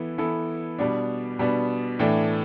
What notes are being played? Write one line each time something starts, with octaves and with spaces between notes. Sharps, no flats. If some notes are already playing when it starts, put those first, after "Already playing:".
Already playing: E3 B3 E4 A4
E3 B3 E4 A4
B2 G3 B3 D4
B2 G3 B3 D4
A2 E3 A3 D4